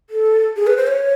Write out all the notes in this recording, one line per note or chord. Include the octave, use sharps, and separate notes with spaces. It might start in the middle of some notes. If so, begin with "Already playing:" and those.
A4
G#4
B4
C5
C#5